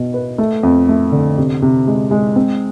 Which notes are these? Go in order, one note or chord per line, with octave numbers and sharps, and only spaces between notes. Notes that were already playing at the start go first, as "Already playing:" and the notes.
Already playing: B2
B4
A3
F2
A3
D3
C3
C3
G#3
G#3
C4